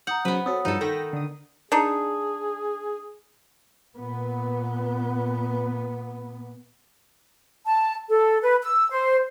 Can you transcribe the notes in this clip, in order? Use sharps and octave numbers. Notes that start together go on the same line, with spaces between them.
F#5 A#5 D#6 G6
C#3 F#3 B3 B4 C5
C4 F#4 A4 C#5 D#6
G2 F3 D#4 A4
D#3 A4 G5 A#6 B6
D3 D#6
D4 D#4 G#4
A#2 B3
A5
A4
B4
E6
C5